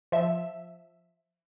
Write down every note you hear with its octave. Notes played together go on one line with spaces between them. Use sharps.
F3 E5